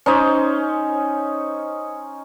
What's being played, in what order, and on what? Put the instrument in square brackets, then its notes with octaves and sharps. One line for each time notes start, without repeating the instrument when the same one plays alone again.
[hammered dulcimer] C#4 D#4 C5 D#5